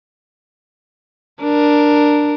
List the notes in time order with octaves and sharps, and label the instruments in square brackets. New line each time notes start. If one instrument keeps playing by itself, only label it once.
[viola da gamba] D4 A#4